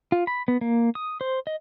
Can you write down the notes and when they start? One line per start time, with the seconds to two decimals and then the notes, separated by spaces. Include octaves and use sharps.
0.12 F4
0.27 B5
0.48 B3
0.61 A#3
0.95 D#6
1.21 C5
1.47 D#5